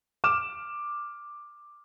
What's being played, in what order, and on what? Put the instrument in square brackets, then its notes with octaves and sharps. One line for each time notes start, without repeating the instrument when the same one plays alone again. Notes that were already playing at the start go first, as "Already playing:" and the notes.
[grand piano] D6 F6 E7